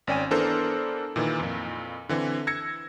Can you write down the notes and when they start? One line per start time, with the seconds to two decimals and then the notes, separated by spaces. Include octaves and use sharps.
0.07 G#1 C#4 D5 G5 G#5 D#7
0.31 E3 B3 D4 A4 A#4 C5
1.16 A#2 D#3 E3
1.39 F2 A#2
2.09 D3 E3 C4
2.47 E6 G#6 A#6 C#7